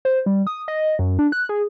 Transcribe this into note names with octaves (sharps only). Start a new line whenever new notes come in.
C5
G3
D#6
D#5
F#2
D4
F#6
G#4